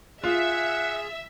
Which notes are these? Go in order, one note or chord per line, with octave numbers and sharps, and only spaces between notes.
F4 G#4 E5 F#5